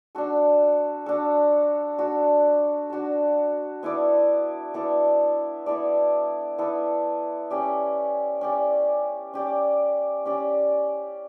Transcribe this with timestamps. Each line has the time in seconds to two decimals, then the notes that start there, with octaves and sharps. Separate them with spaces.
0.15 D4 F#4 A4
1.06 D4 F#4 A4
1.98 D4 F#4 A4
2.90 D4 F#4 A4
3.83 B3 E4 A4 D5
4.74 B3 E4 A4 D5
5.66 B3 E4 A4 D5
6.58 B3 E4 A4 D5
7.50 C#4 G4 D5
8.41 C#4 G4 D5
9.34 C#4 G4 D5
10.25 C#4 G4 D5